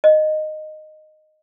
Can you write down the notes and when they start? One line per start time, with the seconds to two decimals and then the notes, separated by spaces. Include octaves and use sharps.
0.04 D#5